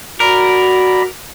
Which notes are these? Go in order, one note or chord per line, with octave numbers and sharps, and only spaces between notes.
F#4 A#4 D5 A#5 B5